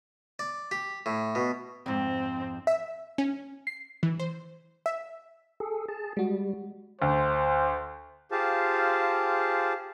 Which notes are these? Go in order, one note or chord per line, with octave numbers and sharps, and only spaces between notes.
D5
G4
A2
B2
F2 G#2 C4
E5
C#4
C7
E3
C5
E5
G#4 A4
G#4 A5
G3 G#3 F#4
D2 C5
F4 G4 G#4 C5 F5 A5